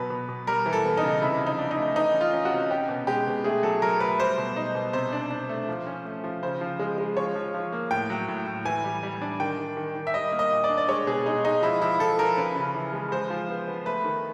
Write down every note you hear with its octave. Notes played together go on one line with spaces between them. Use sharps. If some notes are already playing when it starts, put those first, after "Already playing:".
Already playing: B2 F#3 B4
B2
B2
G3 A#4
E3
A4
B3
D#4
C#3
C3 E4
F3
D#4
D4
D#4
A3
E3 D#4
C#4
F4
C#4
F#4
C3
C#4 G4
B2
G#3 G4
B2
A3 G#4
F#3 A4
F#3 A#4
A3 B4
G3 C5
B2
D#4
B2
C3 C5
D4
D4
A3
F3
C#4
A3
F3
C#3 C5
F3
G#3
G#3
F3 C#5
F3
F3
A#3
A2 G5
F#3
A2
A2
E3 G#5
G3
G3
D4
D#3 G5
D#3
D#3
D#3
E5
G3 D#5
A#3
D#5
A#2
D5
D4
D5
G#3 C#5
B2 G#4
G#3 D#4
G#3 D#4
F3 E4
F3 E4
F3 A4
F3 A#4
C#4 B4
C#3
E3
G#3
G#3 C5
F3
B3
B3
A3 B4
D#3